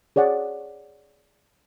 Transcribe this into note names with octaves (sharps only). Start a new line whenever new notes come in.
G#4 C#5 D5 F#5